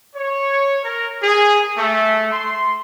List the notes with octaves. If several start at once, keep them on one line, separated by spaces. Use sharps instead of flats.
C#5
A#4
G#4
A3
C6